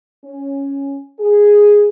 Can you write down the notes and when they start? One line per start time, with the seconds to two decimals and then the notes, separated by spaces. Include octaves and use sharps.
0.24 C#4
1.19 G#4